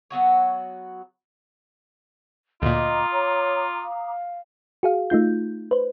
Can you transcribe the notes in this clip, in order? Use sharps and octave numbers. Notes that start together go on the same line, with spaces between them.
F#3 B3 F#4 C#5
D2 A#2 F4 D#5 A#5 D6 D#6
C#5
F5
F#4 G#4 F5
A3 D#4 F4 G6
B4 C5